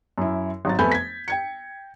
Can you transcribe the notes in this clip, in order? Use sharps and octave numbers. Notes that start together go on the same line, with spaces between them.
F#2 E4
G#1 F#3 A6
F2 A3 B3 G#5 B5 G6
G#6 B6
G5 G#6 C#7